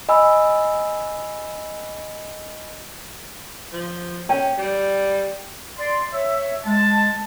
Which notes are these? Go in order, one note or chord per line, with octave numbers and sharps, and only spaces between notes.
D#5 G#5 B5 E6
F3
C#4 G5
G3
D5 C6
C#5 E5
G#3 A5